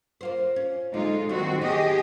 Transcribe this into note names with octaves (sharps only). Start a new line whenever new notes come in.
A#3 F4 C5
C#4
D3 G#3 D#4 F4
D#3 F#3 G3 C4 F#4
D#3 G4 G#4 D#5